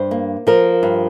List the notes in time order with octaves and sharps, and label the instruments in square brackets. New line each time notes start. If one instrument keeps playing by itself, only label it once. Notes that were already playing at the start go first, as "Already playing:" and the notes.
Already playing: [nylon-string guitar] G2 C5
A#3
F3 A#4
G2